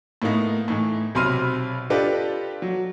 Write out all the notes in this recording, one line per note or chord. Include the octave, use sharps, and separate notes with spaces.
A2 A#3 B3 D#4
A2 E3 D#4
B1 C3 B5 C6 F6 D#7
D4 F4 G4 A4 B4 D#5
F#3